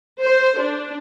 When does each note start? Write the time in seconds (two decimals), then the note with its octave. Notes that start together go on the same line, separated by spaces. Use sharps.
0.22 C5
0.59 D4